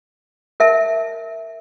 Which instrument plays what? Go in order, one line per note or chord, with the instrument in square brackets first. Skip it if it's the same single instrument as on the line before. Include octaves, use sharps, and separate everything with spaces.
[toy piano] A#4 E5 A5